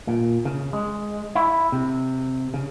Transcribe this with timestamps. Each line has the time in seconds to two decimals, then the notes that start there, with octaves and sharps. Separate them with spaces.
0.08 A#2
0.45 C#3
0.73 G#3
1.35 E4
1.72 C3
2.54 C#3